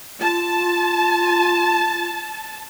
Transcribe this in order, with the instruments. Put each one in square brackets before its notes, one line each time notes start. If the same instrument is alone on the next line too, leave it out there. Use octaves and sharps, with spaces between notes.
[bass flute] F4 [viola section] A5